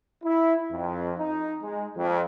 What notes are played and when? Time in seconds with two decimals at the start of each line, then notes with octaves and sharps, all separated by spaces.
0.23 E4
0.71 F2
1.18 D#4
1.62 G#3
1.96 F2